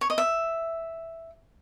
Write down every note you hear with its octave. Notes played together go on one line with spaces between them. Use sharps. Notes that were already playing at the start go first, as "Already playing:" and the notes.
C#5
D#5
E5